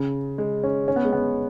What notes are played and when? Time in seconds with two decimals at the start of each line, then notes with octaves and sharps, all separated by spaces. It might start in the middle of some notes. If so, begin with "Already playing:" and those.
Already playing: C#3
0.38 G#3
0.63 C#4
0.88 C#4
0.96 B3
1.04 G#3
1.13 B3